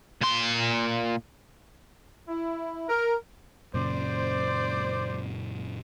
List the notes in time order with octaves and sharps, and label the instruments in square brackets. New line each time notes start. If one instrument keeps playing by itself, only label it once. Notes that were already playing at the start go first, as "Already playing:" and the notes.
[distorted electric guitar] A#2 C6
[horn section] E4
A#4
[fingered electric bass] F#2 A#2 C#3 [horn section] C5 D5